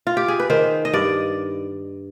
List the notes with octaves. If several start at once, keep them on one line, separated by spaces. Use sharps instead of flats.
F4
G4
G#4
B4
D#3 C5
D#5
G2 D5